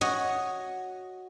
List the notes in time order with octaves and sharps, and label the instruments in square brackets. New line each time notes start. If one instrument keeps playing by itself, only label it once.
[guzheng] F#4 C#5 D#5